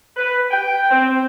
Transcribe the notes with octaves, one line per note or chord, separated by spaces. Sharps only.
B4
G5
C4